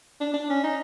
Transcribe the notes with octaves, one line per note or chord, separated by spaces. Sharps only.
D4
D4
C#4
D#4